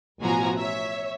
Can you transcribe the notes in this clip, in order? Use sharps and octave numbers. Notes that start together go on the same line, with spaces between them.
A1 B2 F3 F#4 G#5 A#5
C#5 E5